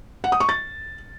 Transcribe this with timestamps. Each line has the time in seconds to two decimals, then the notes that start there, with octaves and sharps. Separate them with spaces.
0.24 F#5
0.32 D#6
0.40 C#6
0.49 A6